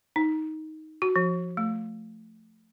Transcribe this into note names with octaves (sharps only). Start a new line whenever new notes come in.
D#4
F#4
F3
A3